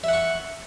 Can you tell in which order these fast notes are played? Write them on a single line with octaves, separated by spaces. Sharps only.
E5 F#5 C#6